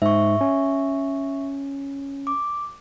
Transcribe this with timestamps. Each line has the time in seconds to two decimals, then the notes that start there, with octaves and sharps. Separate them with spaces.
0.02 G#2 E5 C#6
0.41 C#4
2.27 D6